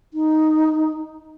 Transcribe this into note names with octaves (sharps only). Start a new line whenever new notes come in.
D#4